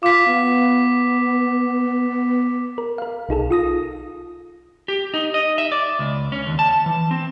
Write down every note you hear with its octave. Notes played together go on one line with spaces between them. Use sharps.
F4 D6 B6
B3
A#4
A#4 F5
B1 D#4 G#4 A4
F4 D#6 A#6
G4
D#4
D#5
E5
D5
C#2
C#4
D#2
A5
E3
C4